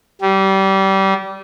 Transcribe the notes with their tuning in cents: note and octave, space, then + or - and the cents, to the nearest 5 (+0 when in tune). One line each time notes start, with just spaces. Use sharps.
G3 -25